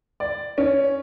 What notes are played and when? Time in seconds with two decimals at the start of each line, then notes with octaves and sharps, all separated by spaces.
0.20 D5
0.58 C#4